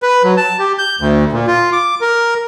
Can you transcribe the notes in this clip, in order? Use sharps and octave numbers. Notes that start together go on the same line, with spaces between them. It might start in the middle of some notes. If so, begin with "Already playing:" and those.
B4
F#3
A5
G4
G6
D2
A#2
F4
D6
A#4